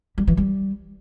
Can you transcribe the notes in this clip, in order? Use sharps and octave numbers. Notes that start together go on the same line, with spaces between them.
G3
E3
G3